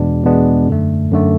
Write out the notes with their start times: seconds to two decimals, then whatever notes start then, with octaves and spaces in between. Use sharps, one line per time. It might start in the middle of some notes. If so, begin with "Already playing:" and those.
Already playing: E2 B2 G#3 B3 D4
0.24 E2 B2 G#3 B3 D4
0.67 F#2 D3 A3
1.12 F#2 D3 A3